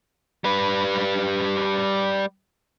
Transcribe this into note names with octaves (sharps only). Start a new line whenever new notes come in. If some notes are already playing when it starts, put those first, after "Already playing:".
G3 B4